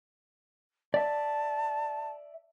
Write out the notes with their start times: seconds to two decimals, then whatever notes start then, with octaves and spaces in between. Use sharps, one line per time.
0.94 D5 E5 A5